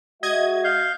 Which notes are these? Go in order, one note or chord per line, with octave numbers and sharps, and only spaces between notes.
G#3 F#4 D#5 E5 G#6
F5 G6